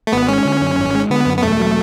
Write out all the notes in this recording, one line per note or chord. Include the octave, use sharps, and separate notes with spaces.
A3
G#1 B3
G#3 C#4
D3
F#2
G#1
G#3
D3 B3
F#2
B3
E1 A3
F#3